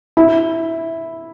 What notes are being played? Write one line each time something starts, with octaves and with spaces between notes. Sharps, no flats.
E4